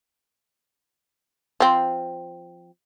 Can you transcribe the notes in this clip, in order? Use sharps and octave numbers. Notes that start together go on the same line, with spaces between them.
F3 C4